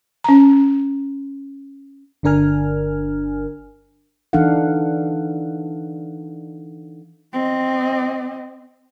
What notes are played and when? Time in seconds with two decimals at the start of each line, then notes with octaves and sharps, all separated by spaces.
0.24 C#4 A#5
2.23 G1 D3 D4 A#4 G#5 F6
4.33 E3 D4 D#4 A4 F5 F#5
7.33 C4 D#5